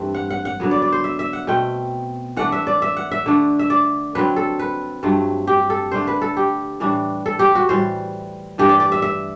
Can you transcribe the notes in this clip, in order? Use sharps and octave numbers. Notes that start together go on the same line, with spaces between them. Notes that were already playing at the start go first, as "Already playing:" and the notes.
Already playing: G2 E3 A3 C4
F#5
F#5
F#5
D3 F#3 B3
D5
D5
C5
E5
E5
F#5
B2 A3 C4 G5
E3 A3 D4 F#5
E5
D5
E5
F#5
E5
D3 A3 D4
E5
D5
D3 F#3 C4 B4
A4
B4
G2 F#3 A3 C4
G4
A4
D3 A3 D4 C5
B4
A4
G4
A2 E3 G3 D4
A4
G4
F#4
A2 E3 G3 C5
G2 E3 A3 G4
D5
D5
E5
E5